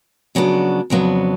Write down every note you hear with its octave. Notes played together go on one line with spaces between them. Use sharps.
F2 C#3 F#3 B3 D4
F2 C#3 F#3 B3 D4